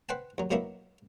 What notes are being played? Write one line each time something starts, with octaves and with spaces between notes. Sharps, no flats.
B4 C5 F#5 G5 A5
D#2 F#3
B2 F#3 A#3 B3 D#4 E4